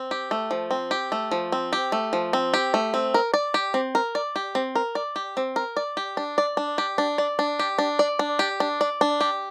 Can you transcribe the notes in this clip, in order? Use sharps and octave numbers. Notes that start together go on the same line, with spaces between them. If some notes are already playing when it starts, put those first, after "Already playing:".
Already playing: C4
G4
A3
F3
C4
G4
A3
F3
C4
G4
A3
F3
C4
G4
A3
C4
A#4
D5
G4
C4
A#4
D5
G4
C4
A#4
D5
G4
C4
A#4
D5
G4
D4
D5
D4
G4
D4
D5
D4
G4
D4
D5
D4
G4
D4
D5
D4
G4